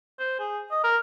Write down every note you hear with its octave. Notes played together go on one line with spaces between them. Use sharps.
C5
G#4
D#5
A#4